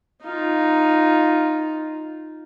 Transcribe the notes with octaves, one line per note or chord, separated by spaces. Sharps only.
D#4 F4